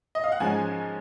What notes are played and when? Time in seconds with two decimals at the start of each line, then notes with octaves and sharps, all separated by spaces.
0.15 D#5
0.24 F5
0.32 F#5
0.40 G#2 F3 G#3 C#4 G#5